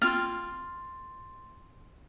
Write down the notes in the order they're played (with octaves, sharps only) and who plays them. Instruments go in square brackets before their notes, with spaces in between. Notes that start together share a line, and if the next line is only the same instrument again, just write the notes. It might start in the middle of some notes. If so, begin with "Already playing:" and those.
[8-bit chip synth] A#3 C4 F4 [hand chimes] C6 A6 [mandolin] F6